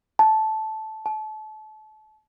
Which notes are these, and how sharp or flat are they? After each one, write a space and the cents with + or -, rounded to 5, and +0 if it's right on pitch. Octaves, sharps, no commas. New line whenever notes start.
A5 -10
A5 -30